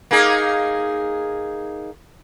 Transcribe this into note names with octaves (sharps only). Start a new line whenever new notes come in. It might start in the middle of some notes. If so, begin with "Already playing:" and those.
A#3 D#4 G#4